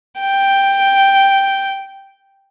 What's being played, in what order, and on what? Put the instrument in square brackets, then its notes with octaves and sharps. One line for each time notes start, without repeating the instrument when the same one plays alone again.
[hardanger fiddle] G5